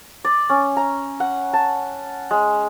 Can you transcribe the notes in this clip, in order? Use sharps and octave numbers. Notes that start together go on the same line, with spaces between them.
D5
C#4
A#5
F#5
A5
G#3